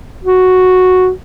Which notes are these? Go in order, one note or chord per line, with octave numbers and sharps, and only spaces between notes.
F#4